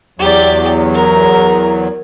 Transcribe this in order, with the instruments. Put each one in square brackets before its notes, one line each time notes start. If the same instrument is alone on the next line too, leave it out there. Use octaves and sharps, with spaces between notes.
[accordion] E2 F#3 [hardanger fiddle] G4 D5
[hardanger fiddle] A#4